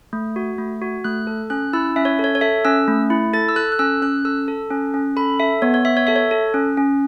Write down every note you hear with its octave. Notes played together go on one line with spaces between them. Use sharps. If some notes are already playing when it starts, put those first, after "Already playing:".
A3
F#4
A3
F#4
A3 F#6
A4
C#4 F#6
E4 E6
C#4 E5
C#5
A4
C#5
C#5
A4 E5
C#4 E6
A3
E4
A4 A6
E6
A4 F#6
F#6
C#4 E6
C#4 F#6
A4 E6
A4
C#4
C#4
A4 B5
A4 E5
B3 C#5
C#5
B3 E5
C#5
A4 E5
C#5
A4
C#4
C#4